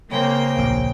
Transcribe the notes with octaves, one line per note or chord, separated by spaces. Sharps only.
C#3 A#3 C4 G5
D1 A#1